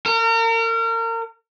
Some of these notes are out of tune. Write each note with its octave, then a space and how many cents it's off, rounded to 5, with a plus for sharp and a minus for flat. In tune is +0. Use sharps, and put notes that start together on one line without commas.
A#4 -35